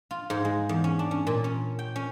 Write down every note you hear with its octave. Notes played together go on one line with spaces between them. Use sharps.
F4
G#2
G#3
E2
C#4
D4
C#4
A#2
C#4
G5
C#4